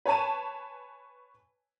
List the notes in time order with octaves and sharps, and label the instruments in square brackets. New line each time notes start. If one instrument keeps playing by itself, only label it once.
[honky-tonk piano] B4 C#5 G#5 A5 D#7